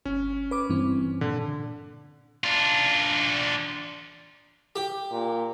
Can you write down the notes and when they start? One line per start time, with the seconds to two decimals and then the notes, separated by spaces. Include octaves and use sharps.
0.05 G1 C#4
0.51 B4 D6
0.69 G2 E3 C4
1.21 A#2 D3
2.44 D4 F4
4.76 G4
5.12 A#2